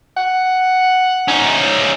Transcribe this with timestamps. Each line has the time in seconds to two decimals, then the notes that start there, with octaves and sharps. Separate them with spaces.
0.17 F#5
1.28 C#4 D#4